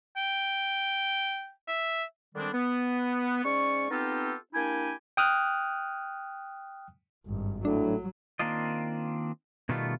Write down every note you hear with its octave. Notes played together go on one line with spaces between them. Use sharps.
G5
E5
D3 D#3 G3 G#3 C4 D4
B3
G#2 C#4 D5 C#6
B3 C4 D#4 F4 G4 A4
A#3 D4 E4 G4 G#5
G5 D#6 F6 F#6
G#1 G2
A2 F#3 D4
D#3 A#3 C4 D4 F4 D#5
B2 D#3 G3 A3 B3 F4